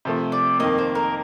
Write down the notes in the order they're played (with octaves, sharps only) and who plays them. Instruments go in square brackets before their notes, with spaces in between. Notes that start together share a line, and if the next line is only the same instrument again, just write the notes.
[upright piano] C3 F3 A3
[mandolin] D5
[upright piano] F2 D#3 A#3 [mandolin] D#5
[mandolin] C5
A#4